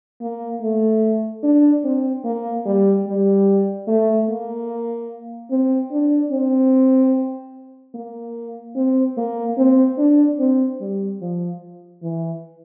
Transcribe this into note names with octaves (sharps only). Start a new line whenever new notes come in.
A#3
A3
D4
C4
A#3
G3
G3
A3
A#3
C4
D4
C4
A#3
C4
A#3
C4
D4
C4
G3
F3
E3